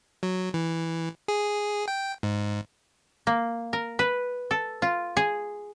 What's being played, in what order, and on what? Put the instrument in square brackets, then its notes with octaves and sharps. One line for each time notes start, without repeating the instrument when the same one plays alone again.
[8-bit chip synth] F#3
E3
G#4
G5
G#2
[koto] A#3
A#4
B4
A4
F4
G#4